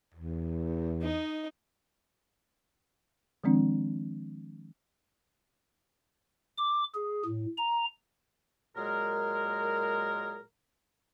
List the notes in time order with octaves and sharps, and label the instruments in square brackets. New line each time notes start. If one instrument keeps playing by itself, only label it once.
[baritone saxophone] E2
[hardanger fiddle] D#4 D#5
[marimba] D#3 F3 G#3 C4 D4
[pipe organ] D6
G#4
A2
A#5
[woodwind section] A#2 F#3 G#3 G#4 A#4